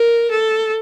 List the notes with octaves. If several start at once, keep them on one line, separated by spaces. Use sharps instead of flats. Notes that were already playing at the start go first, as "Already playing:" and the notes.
Already playing: A#4
A4